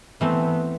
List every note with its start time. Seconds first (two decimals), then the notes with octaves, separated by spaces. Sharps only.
0.21 E3 A3 B3 C4